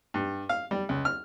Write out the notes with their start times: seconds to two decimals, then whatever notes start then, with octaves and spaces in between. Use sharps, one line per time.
0.14 G2
0.49 F5
0.71 G3
0.89 C#2
1.05 F6